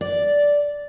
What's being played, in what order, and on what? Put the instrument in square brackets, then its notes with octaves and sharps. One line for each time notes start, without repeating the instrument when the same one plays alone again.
[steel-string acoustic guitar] D5